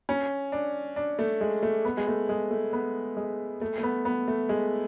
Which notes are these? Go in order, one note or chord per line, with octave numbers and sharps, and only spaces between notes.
C#4
D4
D4
A3
G#3
A3
B3
G#3
A3
G#3
A3
B3
G#3
A3
A3
B3
B3
A3
G#3